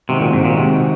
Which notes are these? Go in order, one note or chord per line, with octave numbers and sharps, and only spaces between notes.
C3 D#3 G#3 C4 F#4
A#2
G#2
A#2
C3